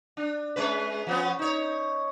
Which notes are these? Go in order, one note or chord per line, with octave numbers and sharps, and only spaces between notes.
D4
G#3 C#4 B4
F3 B3 C#4
D#4 C#5